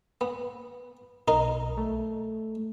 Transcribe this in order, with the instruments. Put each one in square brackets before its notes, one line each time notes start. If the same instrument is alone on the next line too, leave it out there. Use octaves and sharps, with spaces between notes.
[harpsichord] B3
[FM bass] B1 [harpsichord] D#4 A#4
[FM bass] A3